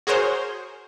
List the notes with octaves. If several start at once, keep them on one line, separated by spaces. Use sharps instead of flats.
F#4 G#4 A#4 C5 C#5